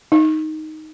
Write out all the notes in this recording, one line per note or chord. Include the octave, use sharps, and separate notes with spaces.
D#4